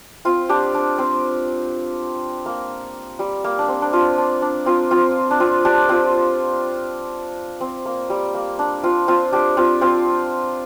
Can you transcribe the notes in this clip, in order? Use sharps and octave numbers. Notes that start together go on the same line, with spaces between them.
C4 F4
D4 G4
D4
C4
A#3
G3
A#3
D4
C4
D4
C4 F4
D4
D4
C4 F4
C4 F4
D4
C4 F4
D4 G4
C4 F4
C4
A#3
G3
A#3
D4
C4 F4
C4 F4
D4 G4
C4 F4
C4 F4